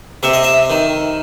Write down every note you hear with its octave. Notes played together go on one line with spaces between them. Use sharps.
C3 E5
D#5
E5
D#3